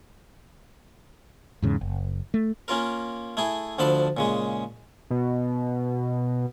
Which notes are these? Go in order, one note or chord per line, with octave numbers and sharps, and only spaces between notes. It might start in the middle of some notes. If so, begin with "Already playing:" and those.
E2 G#2 C#3
F#1
A3
A#3 C#4 F4 A#4
A3 E4 G#4
D2 F3 D4 A4 A5 B5
A#2 C#3 G#3
B2